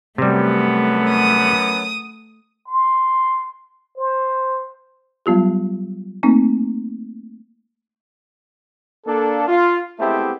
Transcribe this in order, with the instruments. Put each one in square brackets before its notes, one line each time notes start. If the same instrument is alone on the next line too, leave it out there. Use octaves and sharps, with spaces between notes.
[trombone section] F#2 F#3 B3 [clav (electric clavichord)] C3 G3 [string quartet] A3
[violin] D#6
[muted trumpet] C6
C5
[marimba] F#3 G3 B3 F4 G4
A3 A#3 C4 D#4
[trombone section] A#3 D4 A4
F4
G#3 A3 B3 C4 E4 G4